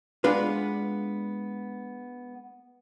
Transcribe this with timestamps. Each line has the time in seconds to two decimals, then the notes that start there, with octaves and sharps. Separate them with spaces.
0.24 G#3 B3 D4 F4 B4